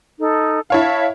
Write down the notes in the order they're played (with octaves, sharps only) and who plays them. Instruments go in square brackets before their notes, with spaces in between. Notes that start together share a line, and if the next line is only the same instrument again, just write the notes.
[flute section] D#4 A4
[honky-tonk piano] E4 C#5 F5 [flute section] E5 A5